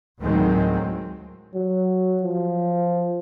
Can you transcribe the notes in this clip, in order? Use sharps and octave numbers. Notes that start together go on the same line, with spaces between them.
D2 A2 D#3 F#3 G#3 C4
F#3
F3